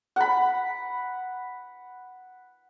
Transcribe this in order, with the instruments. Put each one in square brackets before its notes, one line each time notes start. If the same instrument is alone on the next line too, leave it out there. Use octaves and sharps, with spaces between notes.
[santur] F#5 B5